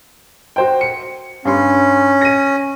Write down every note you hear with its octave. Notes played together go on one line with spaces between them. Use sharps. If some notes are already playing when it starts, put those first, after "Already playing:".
F#4 C5 G5
C#7
G2 C#4 C6
A#6 D#7